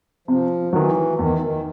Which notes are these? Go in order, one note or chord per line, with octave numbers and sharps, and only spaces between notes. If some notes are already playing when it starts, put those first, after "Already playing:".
C3 F3
D#3 E3 F#3
E2 D#3
D#3